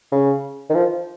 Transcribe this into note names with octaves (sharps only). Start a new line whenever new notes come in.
C#3
D#3
F3